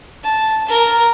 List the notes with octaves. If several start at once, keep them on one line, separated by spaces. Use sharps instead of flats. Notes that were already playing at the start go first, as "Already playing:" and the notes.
A5
A#4